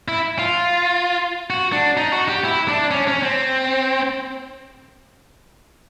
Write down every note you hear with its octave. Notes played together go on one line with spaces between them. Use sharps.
E4
F4
F#4
D4
D#4
F#4
G4
E4
D4
C#4
C#4
C4